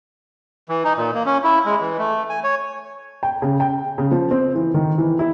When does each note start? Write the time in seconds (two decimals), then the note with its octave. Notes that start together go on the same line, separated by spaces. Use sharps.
0.69 E3
0.84 D#4
0.97 A#2
1.14 A#3
1.26 C#4
1.44 E4
1.66 G#3
1.80 E3
1.98 A3
2.29 G#5
2.44 C#5
3.23 G5
3.42 C#3
3.60 G5
3.98 C#3
4.11 F3
4.31 C4
4.55 E3
4.74 D#3
4.98 E3
5.19 E4